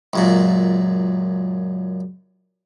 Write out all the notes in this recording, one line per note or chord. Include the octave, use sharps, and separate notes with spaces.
C#2 F#2 A#2